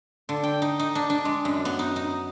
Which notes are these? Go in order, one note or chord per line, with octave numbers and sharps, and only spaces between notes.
D3
G5
D#4
D#4
D4
D4
G#3
F#2
B3
D#4
D#4